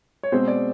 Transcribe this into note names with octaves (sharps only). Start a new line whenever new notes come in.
C#5
B2 G#3 C4 C5
D5